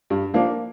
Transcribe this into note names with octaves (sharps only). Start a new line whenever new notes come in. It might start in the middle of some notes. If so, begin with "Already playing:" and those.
G2
F3 A#3 D4